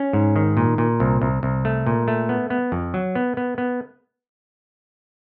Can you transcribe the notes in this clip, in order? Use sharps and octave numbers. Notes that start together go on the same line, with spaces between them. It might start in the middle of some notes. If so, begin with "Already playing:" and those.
Already playing: C#4
G#2
D#3
A#2
A#2
C2
C2
C2
A3
A#2
A3
B3
B3
F2
F#3
B3
B3
B3